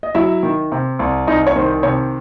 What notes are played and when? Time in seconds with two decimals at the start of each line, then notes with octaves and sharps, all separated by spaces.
0.03 D#5
0.15 F#3 E4 E5
0.43 D#3
0.72 C3
0.99 C2
1.27 C2 D#4 D#5
1.47 C#5
1.56 D#3 C5
1.83 C3 C#5